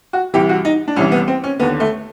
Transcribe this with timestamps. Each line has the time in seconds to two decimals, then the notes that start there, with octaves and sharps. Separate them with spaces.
0.13 F#4
0.34 C2 C3 E3 G4
0.49 F#4
0.65 D#4
0.88 D4
0.96 C2 C3 E3 C#4
1.12 B3
1.28 C4
1.44 C#4
1.59 D3 B3
1.62 D#2
1.80 A3